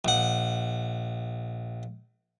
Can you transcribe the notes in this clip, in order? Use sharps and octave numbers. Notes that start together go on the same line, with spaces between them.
A#1 F#5